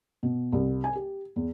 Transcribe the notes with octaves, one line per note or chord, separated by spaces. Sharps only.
B2
C2
G#5
G4
E2